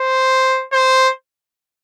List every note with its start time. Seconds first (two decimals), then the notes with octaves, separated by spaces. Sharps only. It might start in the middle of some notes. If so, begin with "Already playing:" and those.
Already playing: C5
0.73 C5